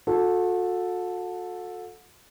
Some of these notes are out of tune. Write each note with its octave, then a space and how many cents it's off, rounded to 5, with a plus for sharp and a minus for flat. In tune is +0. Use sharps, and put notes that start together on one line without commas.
F#4 -40 A4 +0